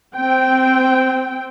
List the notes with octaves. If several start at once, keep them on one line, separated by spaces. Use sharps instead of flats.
C4 G5